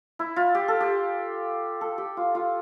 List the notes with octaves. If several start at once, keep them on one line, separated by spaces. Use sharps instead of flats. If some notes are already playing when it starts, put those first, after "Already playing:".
E4
F4
G4
A4
G4
A4
G4
F4
F4